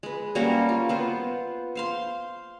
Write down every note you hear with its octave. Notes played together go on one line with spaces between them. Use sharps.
G#3 B4
G3 A#3 C#4 F#4
F4
B3 F4 C5
C5 F5 C6